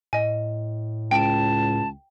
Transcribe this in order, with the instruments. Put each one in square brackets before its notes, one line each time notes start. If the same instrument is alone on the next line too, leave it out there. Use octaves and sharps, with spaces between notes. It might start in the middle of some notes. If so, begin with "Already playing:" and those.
[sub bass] A2 [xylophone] D#5 G#5
[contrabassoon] C#2 [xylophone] G5 D7 [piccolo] A5